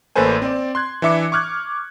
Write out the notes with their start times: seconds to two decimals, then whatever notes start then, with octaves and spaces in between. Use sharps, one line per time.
0.16 A1 A#3 A4 B4 C5 G#5
0.42 C4 D5
0.75 C6 F#6 G#6
1.02 E3 D4 E5 D6 C#7
1.32 C#6 D6 F6 F#6 G#6